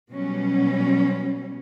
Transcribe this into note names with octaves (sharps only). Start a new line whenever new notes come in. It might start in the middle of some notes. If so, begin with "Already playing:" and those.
B2 F#3 G3 C#4